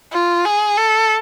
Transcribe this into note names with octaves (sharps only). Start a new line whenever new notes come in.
F4
G#4
A4